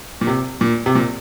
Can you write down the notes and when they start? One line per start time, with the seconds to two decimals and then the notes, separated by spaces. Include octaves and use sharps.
0.21 A#2
0.27 C3
0.61 A#2
0.86 C3
0.95 A#2